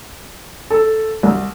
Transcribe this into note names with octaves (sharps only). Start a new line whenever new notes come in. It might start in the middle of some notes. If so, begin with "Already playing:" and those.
A4
C2